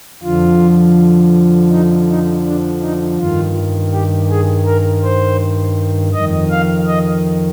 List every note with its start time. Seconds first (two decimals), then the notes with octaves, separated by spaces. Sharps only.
0.23 F2 D3 F3 F4
1.70 D#4
2.08 D#4
2.45 D4
2.82 D#4
3.19 G2 D#3 F4
3.92 G4
4.30 G#4
4.66 A#4
5.03 C5
6.14 F2 D#3 D#5
6.51 F5
6.88 D#5